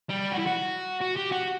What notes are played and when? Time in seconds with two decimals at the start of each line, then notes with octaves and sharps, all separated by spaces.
0.10 G3
0.32 F#4
0.39 E4
0.47 F#4
1.02 F#4
1.17 G4
1.32 F#4